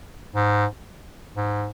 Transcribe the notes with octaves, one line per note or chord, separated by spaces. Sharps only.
G#2
G#2